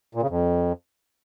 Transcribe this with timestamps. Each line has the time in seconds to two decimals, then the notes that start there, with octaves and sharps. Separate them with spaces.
0.15 A#2
0.22 C#3
0.29 F2